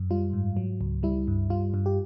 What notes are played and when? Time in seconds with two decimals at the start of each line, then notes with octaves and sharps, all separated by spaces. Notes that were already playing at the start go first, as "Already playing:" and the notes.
Already playing: F#2
0.11 G3 F4
0.33 G#2
0.57 F#3
0.81 C#2
1.03 G3 E4
1.28 G2
1.50 G3 F4
1.74 G2
1.86 G4